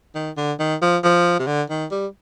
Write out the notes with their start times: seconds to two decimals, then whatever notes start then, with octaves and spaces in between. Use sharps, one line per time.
0.15 D#3
0.37 D3
0.59 D#3
0.82 F3
1.04 F3
1.39 C3
1.47 D3
1.70 D#3
1.91 G3